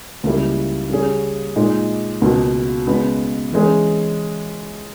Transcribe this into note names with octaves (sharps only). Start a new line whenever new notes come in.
C#2 C#3 G3 A#3 E4
C#3 G3 C#4 G#4
A#2 G#3 D#4
C#2 B2 A#3
C#3 G#3 B3
E3 G#3 C#4 G#4